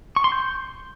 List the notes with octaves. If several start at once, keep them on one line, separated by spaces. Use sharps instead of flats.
C#6
C6
G6